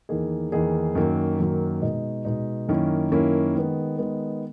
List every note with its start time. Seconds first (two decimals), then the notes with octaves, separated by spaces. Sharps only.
0.09 E2 D#3 A#3 D#4 G#4
0.52 E2 D#3 A#3 D#4 G#4
0.95 F#2 D#3 F#3 A#3
1.38 F#2 D#3 F#3 A#3
1.82 B2 G#3 D#4
2.25 B2 G#3 D#4
2.68 F#2 D#3 A#3 C#4 E4
3.11 F#2 D#3 A#3 C#4 E4
3.55 D#3 G#3 B3
3.98 D#3 G#3 B3